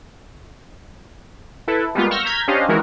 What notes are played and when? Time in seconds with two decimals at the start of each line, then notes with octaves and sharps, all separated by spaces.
1.68 E4 A4 B4
1.95 G3 G#3 A#3 B3 F4
2.11 C#6 E6 F6 G6 A#6
2.25 A#5 F6 G6 G#6 B6
2.48 C#4 D4 G4 C5 D#5 F5
2.68 D#3 E3 G#3 E4 F#4 A#4